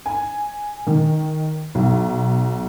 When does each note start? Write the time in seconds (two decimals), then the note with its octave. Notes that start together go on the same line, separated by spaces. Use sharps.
0.06 G#5
0.87 D#3
1.75 B1